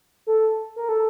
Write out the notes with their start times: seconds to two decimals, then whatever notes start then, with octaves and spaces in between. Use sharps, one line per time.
0.27 A4
0.76 A#4
0.89 A4